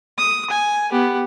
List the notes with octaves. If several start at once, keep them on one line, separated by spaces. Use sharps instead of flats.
D#6
G#5
B3 G4